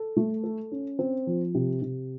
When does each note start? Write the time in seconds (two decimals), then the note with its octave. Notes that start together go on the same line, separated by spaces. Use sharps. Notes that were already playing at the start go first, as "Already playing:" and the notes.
Already playing: A4
0.17 A3
0.44 A4
0.71 C#4
0.99 C4
1.27 F3
1.54 C3
1.82 C3